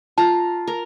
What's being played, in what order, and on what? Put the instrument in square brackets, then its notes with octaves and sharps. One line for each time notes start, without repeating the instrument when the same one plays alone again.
[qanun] F4 A#5 [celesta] A5
[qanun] A#4